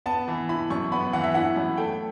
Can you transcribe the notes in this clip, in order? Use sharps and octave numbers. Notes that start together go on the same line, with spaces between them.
B3 A5
E3
E4 B5
F#2 C#6
B3 B5
E3 F#5
E5
E4 F#5
F#2
A3 G5